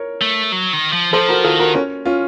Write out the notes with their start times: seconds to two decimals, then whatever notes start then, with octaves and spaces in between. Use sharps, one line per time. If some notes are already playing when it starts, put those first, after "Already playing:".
Already playing: A#4 C#5
0.22 A3
0.52 F#3
0.73 D#3
0.93 F3
1.13 F3 A4 C5
1.29 F#4 A#4
1.44 D#3 F4 A4
1.59 F#4 A#4
1.75 C#4
2.05 C#4 F4